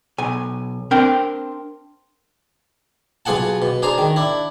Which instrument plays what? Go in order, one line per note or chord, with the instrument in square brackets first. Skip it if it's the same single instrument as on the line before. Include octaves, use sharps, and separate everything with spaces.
[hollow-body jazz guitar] B1 G#5
C4 D4 A#4 G5
[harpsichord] B1 F4 G#4 F#5 A5
B2
D4 G#4 C5 A#5
D#3
D4 E4